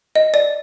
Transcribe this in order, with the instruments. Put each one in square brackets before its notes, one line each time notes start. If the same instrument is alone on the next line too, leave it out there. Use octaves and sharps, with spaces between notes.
[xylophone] D#5
D5